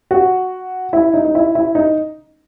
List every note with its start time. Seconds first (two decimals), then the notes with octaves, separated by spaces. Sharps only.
0.11 F#4
0.93 E4
1.14 D#4
1.25 D#4
1.35 E4
1.55 E4
1.75 D#4